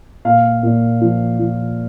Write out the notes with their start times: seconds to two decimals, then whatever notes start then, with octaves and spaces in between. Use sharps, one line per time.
0.25 A#2 F5
0.63 A#2
1.01 F3
1.39 F3